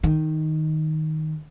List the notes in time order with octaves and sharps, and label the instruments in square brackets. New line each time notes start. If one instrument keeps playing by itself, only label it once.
[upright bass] D#3